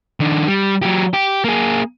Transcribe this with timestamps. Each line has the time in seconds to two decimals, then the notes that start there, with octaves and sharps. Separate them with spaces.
0.20 D#3 D4
0.48 G3
0.82 F#3 G4
1.13 G4
1.44 A#3 G#4